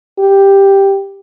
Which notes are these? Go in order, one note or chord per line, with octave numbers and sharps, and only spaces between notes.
G4